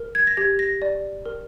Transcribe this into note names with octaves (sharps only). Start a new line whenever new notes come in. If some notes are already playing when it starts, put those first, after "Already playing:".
Already playing: A#4
G#6
A#6
G4 G#6
A#6
D5
A#4